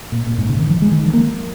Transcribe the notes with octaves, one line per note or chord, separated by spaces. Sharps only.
A#2
A#2
G#2
C#3
D#3
F3
G#3
D#3
F3
A#3